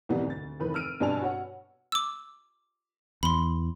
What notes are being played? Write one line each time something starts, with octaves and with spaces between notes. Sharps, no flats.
B1 E2 C3 D#3 G3 B3
D2 A6
F1 E2 D#3 B4
E6 F6 D7 D#7
G2 B2 D4 G#5 A5 F7
F#4 C#5 F#5
D6 E6
E2 B5 C6